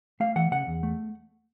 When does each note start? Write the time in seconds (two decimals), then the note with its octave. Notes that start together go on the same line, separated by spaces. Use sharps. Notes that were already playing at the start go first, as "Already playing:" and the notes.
0.20 A3 F5
0.36 E3 F#5
0.51 C#3 F#5
0.67 E2
0.83 A3